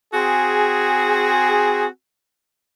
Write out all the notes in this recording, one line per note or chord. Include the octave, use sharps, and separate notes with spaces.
C4 F#4 G#4